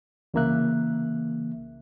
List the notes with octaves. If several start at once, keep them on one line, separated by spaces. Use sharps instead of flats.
C2 C#3 E3 A#3 E5 F#6